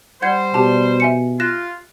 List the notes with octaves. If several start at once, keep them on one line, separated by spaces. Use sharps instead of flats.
G3 C5 F#5 G6 G#6
B2 G4 A5
E5 G#5 C#7
F4 F#6 A#6 E7